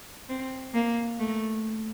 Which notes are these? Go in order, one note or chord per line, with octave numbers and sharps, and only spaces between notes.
C4
A#3
A3